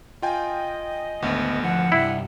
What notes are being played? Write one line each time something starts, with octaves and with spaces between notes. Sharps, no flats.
F4 D#5 G5 G#5
G#1 D2 B3
F3 F#5
G2 C3 E4